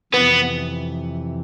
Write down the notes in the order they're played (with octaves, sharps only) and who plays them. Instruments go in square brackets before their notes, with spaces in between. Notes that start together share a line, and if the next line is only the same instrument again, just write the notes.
[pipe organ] F2 C3 E3 [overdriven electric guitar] B3